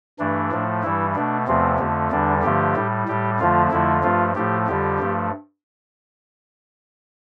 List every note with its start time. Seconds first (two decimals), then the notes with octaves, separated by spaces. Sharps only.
0.19 G2 E3 A3 D4
0.52 A2 F3 A3
0.83 G2 E3 G3 E4
1.15 B2 A3 D4
1.47 E2 C3 F3 A3 C4
1.79 F2 D3 A3
2.11 E2 D3 G3 D4
2.43 G2 D3 F3 A3 G4
2.76 A2 G3
3.08 A2 G3 G4
3.40 F2 D3 F3 A3 F4
3.71 F2 D3 F3 A3 E4
4.03 G2 F3 A3 F4
4.35 A2 F3 A3 G4
4.68 F2 D3 G3 G4
5.00 G2 F3 A3